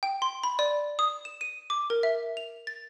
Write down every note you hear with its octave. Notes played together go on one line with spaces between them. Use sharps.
G5
C6
B5
D5
D#6
E7
D#7
D6
A#4
E5
F7
A6